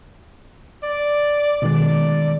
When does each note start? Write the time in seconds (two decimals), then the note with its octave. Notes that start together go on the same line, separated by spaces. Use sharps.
0.84 D5
1.62 B2 D#3 G#3 D5